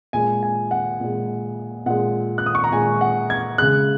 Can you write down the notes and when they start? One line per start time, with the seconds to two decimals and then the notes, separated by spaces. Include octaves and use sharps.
0.13 A#2 G#3 G#5
0.43 G#5
0.71 F#5
1.00 A#2 G#3
1.86 A#2 G#3 F#5
2.38 F#6
2.46 D#6
2.55 C#6
2.64 A#5
2.72 A#2 G#3 G#5
3.01 F#5
3.30 G#6
3.58 C#3 G#3 F#6